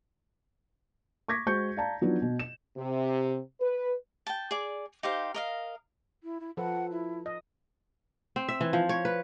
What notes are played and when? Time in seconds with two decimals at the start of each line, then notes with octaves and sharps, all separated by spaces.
1.28 C#6 D6 G#6 A#6 B6
1.46 G#3 F#4 C5 C#6 G6 C#7
1.76 D5 F5 A5 A#5
2.01 F3 F#3 B3 D4 D#4 F4
2.22 B2
2.39 E7
2.77 C3
3.60 B4
4.27 G5 A5
4.51 G#4 D5
5.03 D#4 G4 C5 F5
5.34 A#4 D#5 F5
6.23 E4
6.40 E4
6.57 F3 A4 B4 F#5
6.91 E4
7.26 D#5
8.36 C4
8.49 E5
8.61 E3
8.73 F3
8.89 C#5
9.05 B4